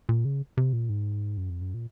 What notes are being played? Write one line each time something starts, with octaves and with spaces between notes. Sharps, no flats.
A#2
C#3
C3
A#2
G#2
F#2
F2
F#2
A#2